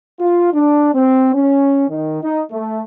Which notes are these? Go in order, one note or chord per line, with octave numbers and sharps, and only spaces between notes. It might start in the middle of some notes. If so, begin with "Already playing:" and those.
F4
D4
C4
C#4
D#3
D#4
A3